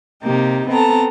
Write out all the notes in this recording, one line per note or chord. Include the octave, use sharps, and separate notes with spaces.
C3 A#3 D#4 G4
B3 C4 A4 A5 A#5